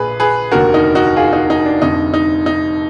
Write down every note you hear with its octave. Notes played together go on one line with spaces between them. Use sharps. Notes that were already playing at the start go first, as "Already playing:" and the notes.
Already playing: A#1 A#2 G#4 B4
G#4 B4
F1 D#2 D3 F#4 A#4
D#4
D#4 F#4
F4 G#4
D#4 F#4
D#4
D4
F1 F2 D3 D#4
D#4
D#4